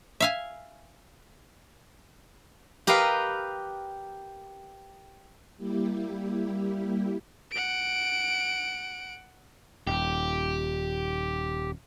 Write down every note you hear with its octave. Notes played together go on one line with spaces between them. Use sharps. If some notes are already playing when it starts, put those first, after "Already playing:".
E5 F5 G#5
G4 A#4 B4 D#5 F5
G3 A#3 E4 G4
F#5 D7
D#1 G4